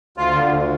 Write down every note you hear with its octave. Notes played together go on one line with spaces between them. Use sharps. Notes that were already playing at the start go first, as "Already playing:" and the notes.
D2 F4
D3
D2